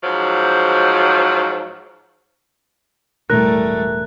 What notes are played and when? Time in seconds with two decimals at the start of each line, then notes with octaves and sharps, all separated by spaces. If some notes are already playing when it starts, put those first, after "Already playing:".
0.02 G#2 F3 F#3
3.30 E1 A2 G3 A3 A#4 F#6